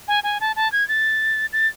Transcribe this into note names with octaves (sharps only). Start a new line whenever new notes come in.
G#5
G#5
A5
A5
G#6
A6
A6